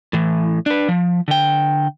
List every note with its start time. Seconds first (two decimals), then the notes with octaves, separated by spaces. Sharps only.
0.13 A2 E3
0.66 D4 B4
0.88 F3
1.28 D3 G5